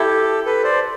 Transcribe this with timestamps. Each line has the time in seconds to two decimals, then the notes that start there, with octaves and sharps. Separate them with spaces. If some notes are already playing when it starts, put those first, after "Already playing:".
Already playing: E4 G4 A4
0.46 A4 B4
0.63 C5 D5